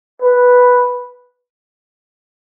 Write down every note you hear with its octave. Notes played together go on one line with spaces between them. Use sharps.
B4